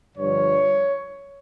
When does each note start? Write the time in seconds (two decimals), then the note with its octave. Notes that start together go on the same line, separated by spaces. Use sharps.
0.16 G2 D3 F3 C#5